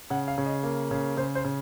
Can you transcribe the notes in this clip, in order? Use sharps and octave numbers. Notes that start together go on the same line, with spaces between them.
C#3 F#5
F5
C#3
D#5
A#3
C#3
C#3 C5
C5
C#3